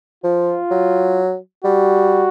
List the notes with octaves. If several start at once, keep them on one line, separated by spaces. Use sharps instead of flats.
F3 F4
F#3
G3 F#4